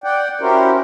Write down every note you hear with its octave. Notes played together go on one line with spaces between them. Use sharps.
D5 F#5 G5
C#4 E4 F#4 G4 A#4 C5